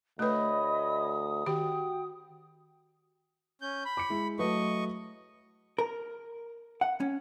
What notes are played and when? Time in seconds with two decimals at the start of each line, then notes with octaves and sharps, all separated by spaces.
0.19 D2 A3 B4 C#5 D#5 B5 D#6
1.46 D#3 F#4 G4 G5
3.62 C#4 G6
3.85 B5
3.97 D6 C#7
4.10 G#3 E4
4.39 F#3 A3 B4 D#5 C#6
5.78 A#4
6.81 F#5
7.00 C#4